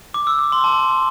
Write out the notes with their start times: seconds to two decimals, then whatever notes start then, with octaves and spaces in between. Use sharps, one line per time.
0.14 D6
0.27 E6
0.39 D6
0.52 C6
0.64 A5